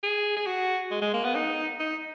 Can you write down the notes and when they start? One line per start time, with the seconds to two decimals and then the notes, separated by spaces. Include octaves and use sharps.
0.03 G#4
0.37 G#4
0.46 F#4
0.91 G#3
1.02 G#3
1.14 A#3
1.24 B3
1.35 D#4
1.80 D#4